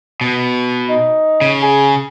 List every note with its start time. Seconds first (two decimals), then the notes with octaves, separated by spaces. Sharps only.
0.21 B2
0.89 D#4
1.41 C#3
1.62 G#4